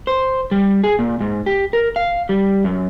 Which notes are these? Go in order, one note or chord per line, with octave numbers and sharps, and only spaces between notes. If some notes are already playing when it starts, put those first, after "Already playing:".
C5
G3
G#4
A#2
G#2
G4
A#4
F5
G3
F#2